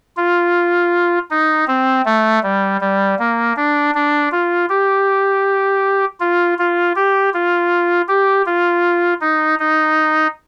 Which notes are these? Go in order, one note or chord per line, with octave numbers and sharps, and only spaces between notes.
F4
D#4
C4
A3
G3
G3
A#3
D4
D4
F4
G4
F4
F4
G4
F4
G4
F4
D#4
D#4